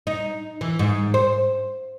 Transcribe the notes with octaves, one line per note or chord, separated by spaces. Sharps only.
D#4
E3
G#2
C5